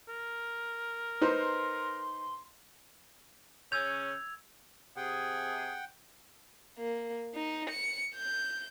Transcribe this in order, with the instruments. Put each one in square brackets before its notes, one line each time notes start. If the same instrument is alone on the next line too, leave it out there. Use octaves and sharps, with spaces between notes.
[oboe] A#4
[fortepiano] D#4 B4 C5 [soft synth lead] C6
[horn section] C#3 C#4 [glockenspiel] E6 G#6 F7 [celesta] G6
[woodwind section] C3 G#4 [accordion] F#5 G5
[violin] A#3
D#4
C#7
G6